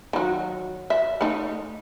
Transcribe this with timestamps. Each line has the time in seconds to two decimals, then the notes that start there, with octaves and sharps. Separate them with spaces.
0.13 D#3 F#3
0.90 E5
1.21 A3 D#4